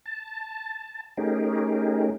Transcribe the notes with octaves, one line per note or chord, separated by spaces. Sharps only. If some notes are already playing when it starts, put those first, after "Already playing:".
A5
A3 C#4 D#4 G4 G#4 A#4